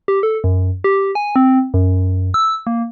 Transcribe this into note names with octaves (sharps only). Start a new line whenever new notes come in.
G4
A4
F#2
G4
G#5
C4
F#2
E6
A#3